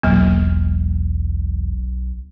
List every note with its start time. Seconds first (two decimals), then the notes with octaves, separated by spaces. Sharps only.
0.03 E1 B1 F#3 A#3